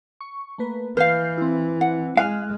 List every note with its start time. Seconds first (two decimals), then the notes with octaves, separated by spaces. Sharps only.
0.21 C#6
0.58 A3 A#3 B4
0.97 E3 B4 F5 F6 G6 C7
1.38 C4 E4
1.81 F#5
2.17 G#3 F5 G#5 F6 F#6